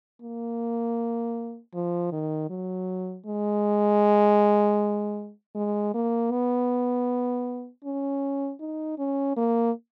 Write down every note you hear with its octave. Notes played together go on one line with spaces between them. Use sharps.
A#3
F3
D#3
F#3
G#3
G#3
A#3
B3
C#4
D#4
C#4
A#3